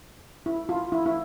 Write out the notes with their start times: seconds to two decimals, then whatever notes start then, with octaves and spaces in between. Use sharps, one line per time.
0.46 E4
0.69 F4
0.92 E4
1.06 E4